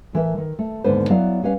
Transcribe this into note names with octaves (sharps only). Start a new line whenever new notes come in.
A2 E3 A#4 E5
D#3
A3
D#2 G#2 D3 B3 B4 C5
F#3 B3 E4 D5 F5
G3 C#4 B4 F5